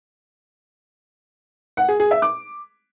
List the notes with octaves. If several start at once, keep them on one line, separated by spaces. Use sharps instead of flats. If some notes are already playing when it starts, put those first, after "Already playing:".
F#5
G#4
G#4
E5
D6